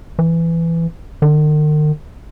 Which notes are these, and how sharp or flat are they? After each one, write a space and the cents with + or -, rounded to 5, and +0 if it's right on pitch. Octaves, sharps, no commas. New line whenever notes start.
E3 +15
D#3 -45